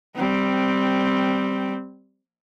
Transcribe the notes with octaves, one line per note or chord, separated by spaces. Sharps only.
G3 C4